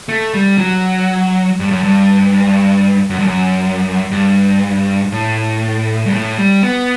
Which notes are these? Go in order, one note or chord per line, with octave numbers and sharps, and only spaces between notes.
A3
G3
F#3
G2
F#2
G2
F#2
G2
F#2
G2
A2
G2
A2
G3
B3